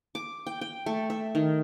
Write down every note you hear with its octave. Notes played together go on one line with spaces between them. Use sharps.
D6
G5
G5
A3
E5
D#3